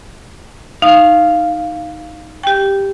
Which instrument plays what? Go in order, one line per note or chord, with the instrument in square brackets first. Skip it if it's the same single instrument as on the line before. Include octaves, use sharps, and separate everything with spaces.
[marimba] D#4 [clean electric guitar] F5
[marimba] G4 G5